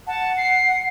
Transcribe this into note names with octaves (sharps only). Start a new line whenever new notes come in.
F#5 A5
C7